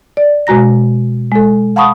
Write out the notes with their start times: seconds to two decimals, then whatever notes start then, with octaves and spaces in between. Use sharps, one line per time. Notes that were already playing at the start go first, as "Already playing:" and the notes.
0.17 D5
0.47 B2 G#3 F#4 A#5 A#6
1.32 G#3 A4
1.76 F5 F#5 A5 B5 C#6 D#6